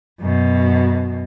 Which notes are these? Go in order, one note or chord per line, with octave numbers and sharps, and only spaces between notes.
F#2 B2